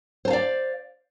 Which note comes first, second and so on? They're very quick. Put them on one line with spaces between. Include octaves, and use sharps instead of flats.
C5 A5 F5 D5